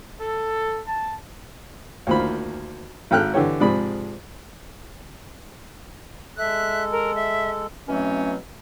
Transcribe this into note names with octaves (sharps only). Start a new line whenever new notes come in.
A4
A5
D2 D#3 A#3 F4 C5 B5
G#1 A4 G5 F6 F#6
D3 E3 G4 C#5
G#2 C3 F3 G#4 D5 B5
G#3 A4 E5 F#6
A#4
E5
B2 E3 F#3 A3 C4 C#4